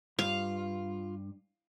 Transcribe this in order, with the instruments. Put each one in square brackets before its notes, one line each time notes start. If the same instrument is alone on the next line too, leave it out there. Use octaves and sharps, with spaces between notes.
[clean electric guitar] G2 [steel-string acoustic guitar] F4 [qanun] F5